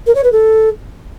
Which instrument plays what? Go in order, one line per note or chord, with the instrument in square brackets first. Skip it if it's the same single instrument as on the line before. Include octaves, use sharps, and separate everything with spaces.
[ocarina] A#4
C#5
B4
A4